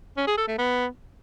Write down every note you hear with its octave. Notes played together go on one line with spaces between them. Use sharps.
C#4
G#4
A4
A3
B3